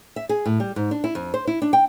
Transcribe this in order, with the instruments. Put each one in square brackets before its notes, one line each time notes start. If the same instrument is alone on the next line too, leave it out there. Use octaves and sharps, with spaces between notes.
[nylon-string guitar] E5
G#4
A2
G3
G#2
D4
E4
F2
C5
E4
D4
G5